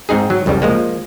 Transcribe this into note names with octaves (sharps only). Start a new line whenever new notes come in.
G#2 C4 D#4 G#4
F#3
C2 F2 C#3 G3
F3 G#3 A#3